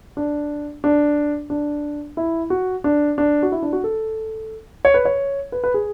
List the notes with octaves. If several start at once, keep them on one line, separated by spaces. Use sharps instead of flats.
D4
D4
D4
E4
F#4
D4
D4
F#4
E4
D4
F#4
A4
C#5
B4
C#5
B4
B4
G#4